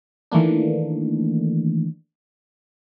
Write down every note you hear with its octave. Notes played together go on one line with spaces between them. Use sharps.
D#3 E3 A3 A#3 D4